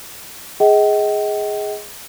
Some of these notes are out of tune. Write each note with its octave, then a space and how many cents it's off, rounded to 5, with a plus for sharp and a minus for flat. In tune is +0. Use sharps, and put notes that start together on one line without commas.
G#4 +0 D#5 +30 G5 -45